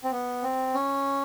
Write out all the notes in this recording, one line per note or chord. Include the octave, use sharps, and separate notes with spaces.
C4
B3
C4
C#4